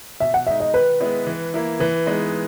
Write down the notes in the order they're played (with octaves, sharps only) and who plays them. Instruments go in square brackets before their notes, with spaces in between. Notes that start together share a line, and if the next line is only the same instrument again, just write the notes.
[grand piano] B2 [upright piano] E5
[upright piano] F#5
[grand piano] G#3 D#4 [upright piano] E5
[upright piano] D#5
[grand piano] D#3 [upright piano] B4
[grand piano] G#3 B3 E4
E3
A#3 E4
[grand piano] E3 [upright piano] B4
[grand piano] G#3 B3 D#4